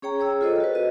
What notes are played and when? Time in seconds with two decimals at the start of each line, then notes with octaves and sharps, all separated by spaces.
0.02 C#4 G#4 C#5 G5 A#5
0.20 G#4 C#5 E6
0.41 F4 A4 C5 D#5
0.60 F#4 B4
0.74 F#4 D#5